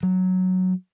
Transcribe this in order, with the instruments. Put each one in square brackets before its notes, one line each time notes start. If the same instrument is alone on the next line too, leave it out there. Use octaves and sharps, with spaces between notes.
[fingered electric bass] F#3